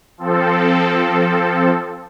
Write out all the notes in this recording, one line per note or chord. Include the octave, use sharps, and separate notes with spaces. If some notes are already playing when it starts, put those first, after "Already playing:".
F3 C4 A4